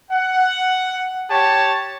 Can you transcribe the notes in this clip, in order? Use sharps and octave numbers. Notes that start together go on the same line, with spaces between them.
F#5
G4 C#5 A5